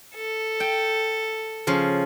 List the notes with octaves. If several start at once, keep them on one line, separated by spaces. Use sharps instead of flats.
A4
G5
C#3 F3